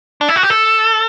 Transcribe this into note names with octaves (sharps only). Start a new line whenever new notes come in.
D4
E4
F#4
G4
A4